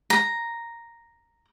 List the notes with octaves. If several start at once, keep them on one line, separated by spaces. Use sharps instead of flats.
A#5